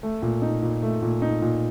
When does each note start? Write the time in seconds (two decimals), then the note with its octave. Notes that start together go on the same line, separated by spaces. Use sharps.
0.03 A3
0.22 A#2
0.42 D#4
0.62 A#2
0.82 A3
1.02 A#2
1.22 D#4
1.42 A#2